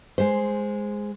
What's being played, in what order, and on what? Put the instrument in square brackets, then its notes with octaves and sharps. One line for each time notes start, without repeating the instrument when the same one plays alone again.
[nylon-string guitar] G#3 C5